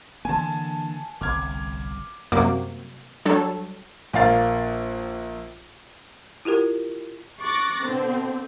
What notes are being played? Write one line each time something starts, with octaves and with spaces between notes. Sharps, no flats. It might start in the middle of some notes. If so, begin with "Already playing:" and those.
D3 E3 A#3 G#5 A5
G1 C2 D6 F6 G#6
F#2 C3 G3 A#3 F#4 D6
F#3 G3 D4 A4 C#5
A#1 A#3 F5 A6
E4 F4 G4 A#4
C#6 D6 F#6 A6 A#6
B2 D3 C4